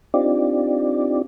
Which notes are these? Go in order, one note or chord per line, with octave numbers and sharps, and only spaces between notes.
C4 D4 D#4 F4 G4 D5